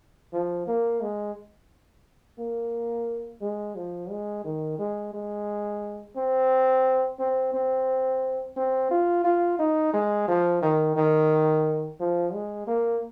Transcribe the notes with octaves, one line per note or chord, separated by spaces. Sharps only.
F3
A#3
G#3
A#3
G#3
F3
G#3
D#3
G#3
G#3
C4
C4
C4
C4
F4
F4
D#4
G#3
F3
D#3
D#3
F3
G#3
A#3